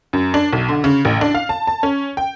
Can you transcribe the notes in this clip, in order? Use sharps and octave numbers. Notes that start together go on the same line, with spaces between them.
F#2
D4
B1
D3
C#3
A1
D4
F5
A5
A5
C#4
G5